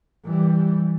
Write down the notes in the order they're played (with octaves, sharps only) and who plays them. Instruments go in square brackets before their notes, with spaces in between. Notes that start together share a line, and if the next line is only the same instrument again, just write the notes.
[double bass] E3 G3